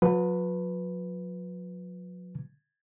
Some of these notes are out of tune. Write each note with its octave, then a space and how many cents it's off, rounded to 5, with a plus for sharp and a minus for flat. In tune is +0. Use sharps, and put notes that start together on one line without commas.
F#3 -45 B4 +0